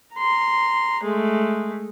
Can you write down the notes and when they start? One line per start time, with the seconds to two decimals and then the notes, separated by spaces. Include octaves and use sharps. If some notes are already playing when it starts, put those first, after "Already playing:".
0.14 A#5 C6
1.04 G#3 A3